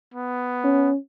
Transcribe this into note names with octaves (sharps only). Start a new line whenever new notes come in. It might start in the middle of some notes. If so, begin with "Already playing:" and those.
B3
C#4